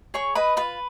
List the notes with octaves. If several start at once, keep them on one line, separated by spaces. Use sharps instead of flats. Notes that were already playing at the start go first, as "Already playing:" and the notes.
G#4 C#5 C#6
B4 D#5 B5
F4 B4 B5